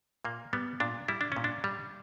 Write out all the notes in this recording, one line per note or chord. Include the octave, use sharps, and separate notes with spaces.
A#2 A#3
G3 B3
A#2 D4
G3 E4
D4
A#2 C#4
D4
G3